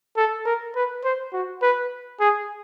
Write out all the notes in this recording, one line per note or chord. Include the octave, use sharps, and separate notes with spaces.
A4
A#4
B4
C5
F#4
B4
G#4